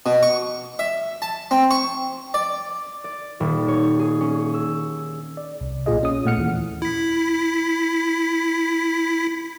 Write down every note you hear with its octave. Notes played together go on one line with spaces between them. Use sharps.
B2
C#6
E5
A5
C4
C#6
D5
D5
D#1
C#5
G#4
C#4
E6
D5
C2
B1 A#2 F4 G#4 D#5
C#4 D#6
A#2 A3 F#5 F6 C#7
D#2 E3
E4 B6